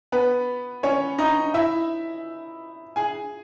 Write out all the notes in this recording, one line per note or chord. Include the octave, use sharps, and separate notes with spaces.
B3 B4
C#4 C#5
D#4 D#5
E4 E5
G#4 G#5